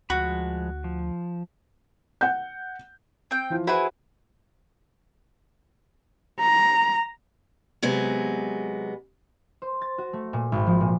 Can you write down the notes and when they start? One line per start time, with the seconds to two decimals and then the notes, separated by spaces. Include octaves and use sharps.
0.10 D2 F3 G#3 F#4 B5
0.84 F3
2.21 F#5 G6
3.31 C4 G5
3.50 E3 F3 F4
3.67 E4 F#4 G#4 B4 C5 F#5
6.40 A#5
7.82 C3 F#3 G#3 B3
9.62 C5
9.82 A6
9.98 F#4
10.13 A3
10.33 A#2
10.52 G#1
10.67 F3
10.80 A#2